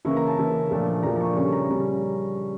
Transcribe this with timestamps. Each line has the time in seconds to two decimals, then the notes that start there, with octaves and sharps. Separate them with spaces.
0.05 C#3 E3 A#3 E4 C#6
0.17 A#5
0.27 A5
0.38 C#3 E3 A#3 E4
0.71 A#2 F3 A3 D4
1.03 A#2 F3 A3 D4 A#5
1.16 A#5
1.20 C#6
1.37 C#3 G3 C#4 C#6
1.53 A#5
1.69 C#3 G3 C#4